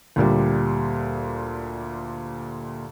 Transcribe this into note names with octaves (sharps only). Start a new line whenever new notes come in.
D2 A#2 G3